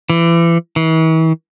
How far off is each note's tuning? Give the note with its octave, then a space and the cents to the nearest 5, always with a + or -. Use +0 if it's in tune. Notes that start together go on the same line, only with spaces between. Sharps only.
E3 +30
E3 -40